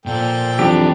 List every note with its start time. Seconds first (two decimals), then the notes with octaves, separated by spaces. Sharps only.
0.06 A#2 F3 A4 G5
0.59 F2 E3 F#3 D4 G4